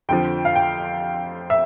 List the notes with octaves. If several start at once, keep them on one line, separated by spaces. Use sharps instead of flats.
F2 D3 F3 G5
F5
G5
E5